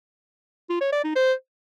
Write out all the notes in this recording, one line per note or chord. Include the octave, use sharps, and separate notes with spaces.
F4
C#5
D5
D#4
C5